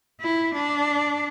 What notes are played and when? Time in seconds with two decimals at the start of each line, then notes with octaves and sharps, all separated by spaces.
0.20 E4
0.54 D4